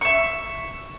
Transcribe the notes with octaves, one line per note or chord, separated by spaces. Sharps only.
E5 C#6